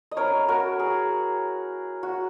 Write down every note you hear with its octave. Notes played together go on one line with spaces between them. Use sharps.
D#5
F#3 C#4 E4 A#4 C#5
F#4 A#4
G#4
F#4